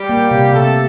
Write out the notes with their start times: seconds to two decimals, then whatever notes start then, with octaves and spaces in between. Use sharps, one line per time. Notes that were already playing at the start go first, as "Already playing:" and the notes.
Already playing: G3 G4
0.09 A#3
0.31 C3
0.53 C3 A3 A4